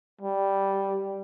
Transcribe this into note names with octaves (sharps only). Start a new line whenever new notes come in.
G3